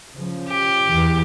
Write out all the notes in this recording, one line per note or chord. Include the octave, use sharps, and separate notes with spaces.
C#3 F3
G4
E2 E3